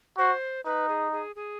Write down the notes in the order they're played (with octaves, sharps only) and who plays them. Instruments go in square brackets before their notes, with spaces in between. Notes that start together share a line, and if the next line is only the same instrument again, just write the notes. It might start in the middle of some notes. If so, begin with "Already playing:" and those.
[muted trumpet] F#4 [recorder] C5
[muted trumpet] D#4 [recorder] B4
[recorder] G#4
G#4
G#4